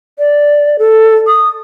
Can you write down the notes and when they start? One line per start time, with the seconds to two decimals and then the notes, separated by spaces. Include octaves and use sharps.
0.19 D5
0.79 A4
1.27 D#6